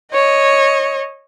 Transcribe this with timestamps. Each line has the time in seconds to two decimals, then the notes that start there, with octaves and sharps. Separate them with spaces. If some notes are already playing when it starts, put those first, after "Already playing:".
0.13 C#5 D#5